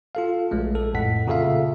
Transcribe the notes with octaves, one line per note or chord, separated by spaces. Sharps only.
F4 A4 F5
A#1 G#3 A3
A4
F2 A2 F#5 B6
A#2 C#3 F4 A4 E5 F5